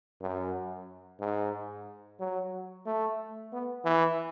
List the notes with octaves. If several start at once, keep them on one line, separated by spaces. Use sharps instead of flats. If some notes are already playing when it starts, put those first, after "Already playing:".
F#2
G#2
F#3
A3
B3
E3